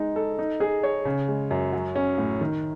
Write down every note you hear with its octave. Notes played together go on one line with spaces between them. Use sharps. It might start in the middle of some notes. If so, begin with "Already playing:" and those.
Already playing: G#3 D#4
A4
D#4
G#4
C#5
C#3
G#3
F#2
F#3
C#4
A2
D#3